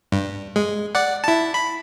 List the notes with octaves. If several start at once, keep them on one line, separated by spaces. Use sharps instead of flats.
G2
G#3
D5 F#5
E4 A5
B5